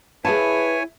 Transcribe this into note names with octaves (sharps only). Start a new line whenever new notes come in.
E4 G#4 B4 C#5 F5 G#5 A5